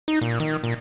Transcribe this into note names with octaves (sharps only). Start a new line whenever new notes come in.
D#4
A#2
D#3
A#2